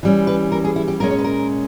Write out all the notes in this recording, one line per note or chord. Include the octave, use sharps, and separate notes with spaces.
E3 G3 C#4
B4
A#4
G#4
E4
G4
A#2 G#3 C#4 A#4
C#5
B4
A#4